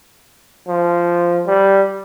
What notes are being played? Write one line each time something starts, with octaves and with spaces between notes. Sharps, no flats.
F3
G3